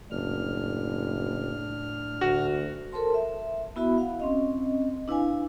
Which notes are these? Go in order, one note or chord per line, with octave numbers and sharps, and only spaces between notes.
F#1 A2 D4 F6
D2 F#4
A4 A#4 C5 A5 C6
E5
B3 E4 F#4 E5 B5
F5 F#5
C4 C#4 D#5
D4 E4 B4 F5 G#5